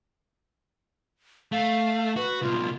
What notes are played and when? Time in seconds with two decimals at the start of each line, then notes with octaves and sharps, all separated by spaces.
1.52 A3 F5
2.16 F#4 B4
2.42 C2 B2 F4